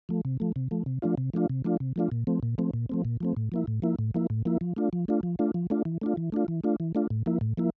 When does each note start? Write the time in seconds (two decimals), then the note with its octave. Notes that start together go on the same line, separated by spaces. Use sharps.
0.09 F3 A3
0.25 C3
0.40 F3 A3
0.56 C3
0.71 F3 A3
0.86 C3
1.02 F3 A3 D4 F4
1.17 C3
1.34 F3 A3 D4 F4
1.50 C3
1.64 F3 A3 D4 F4
1.80 C3
1.96 F3 A3 D4 F4
2.12 A#2
2.27 F3 A3 C4
2.43 A#2
2.58 F3 A3 C4
2.74 A#2
2.89 F3 A3 C4
3.05 A#2
3.20 F3 A3 C4
3.37 A2
3.52 F3 A#3 E4
3.67 A2
3.82 F3 A#3 E4
3.99 A2
4.14 F3 A#3 E4
4.30 A2
4.45 F3 A#3 E4
4.61 F3
4.76 A3 D4 F4
4.93 F3
5.08 A3 D4 F4
5.23 F3
5.39 A3 D4 F4
5.54 F3
5.70 A3 D4 F4
5.85 E3
6.01 A3 D4 F4
6.17 E3
6.32 A3 D4 F4
6.48 E3
6.64 A3 D4 F4
6.80 E3
6.95 A3 D4 F4
7.10 A2
7.26 F3 A#3 E4
7.41 A2
7.57 F3 A#3 E4